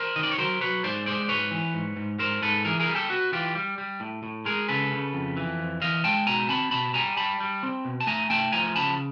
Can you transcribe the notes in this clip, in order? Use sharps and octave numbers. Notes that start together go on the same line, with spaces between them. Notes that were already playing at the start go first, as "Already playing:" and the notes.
Already playing: A#4 C5
D#3 D#5
D5
C#5
F#3 A#4 C5
F#3 B4 C#5
G#2 C5 D5
G#3 C5 D5
G#2 B4 C#5
E3
G#2
G#2
G#2 A#4 C5
G#2 A4 B4
E3 G#4 A#4
G#4 A#4
G3
G4 A4
B3 F#4
E3 F4 G4
G3
G3
A2
A2
G#3 G#4 A#4
C#3 A4 B4
C#3
F2
E3
F2
E3 D#5 F5
G#3 G5 A5
B2 G#5 A#5
C4 A5 B5
B2 A5 B5
G3 G#5 A#5
G3 A5 B5
G3
C4
B2
A5
A3 G#5 A#5
A3 G5 A5
F3 G#5 A#5
C#3 A5 B5